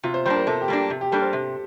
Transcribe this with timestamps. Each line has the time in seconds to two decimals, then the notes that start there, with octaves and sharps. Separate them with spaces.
0.03 C3 F4
0.14 C5
0.25 G3 A#3 D4 C5
0.36 A#4
0.47 C3 A4
0.61 G4
0.68 G3 A#3 D4
0.90 C3
1.01 G4
1.12 G3 A#3 D4 A4
1.22 C5
1.33 C3